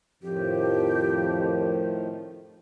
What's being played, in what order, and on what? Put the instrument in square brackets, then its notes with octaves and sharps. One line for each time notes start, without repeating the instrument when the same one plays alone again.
[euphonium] F2 [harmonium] A2 D#3 F3 [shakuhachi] G4